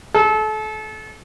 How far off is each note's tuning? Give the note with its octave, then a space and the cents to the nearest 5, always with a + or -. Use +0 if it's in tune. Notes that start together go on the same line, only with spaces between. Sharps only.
A4 -35